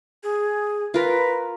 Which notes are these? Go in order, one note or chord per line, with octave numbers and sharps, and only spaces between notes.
G#4
F4 A#4 B4